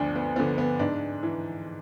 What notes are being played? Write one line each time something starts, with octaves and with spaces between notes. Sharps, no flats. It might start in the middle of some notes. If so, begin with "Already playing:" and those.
Already playing: D2 D3 F3 D4
B3
D3 F3 B3
B3
G#2 D4
E3